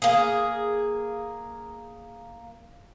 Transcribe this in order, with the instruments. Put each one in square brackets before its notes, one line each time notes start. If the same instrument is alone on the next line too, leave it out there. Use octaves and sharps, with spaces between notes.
[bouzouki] A#3 G#4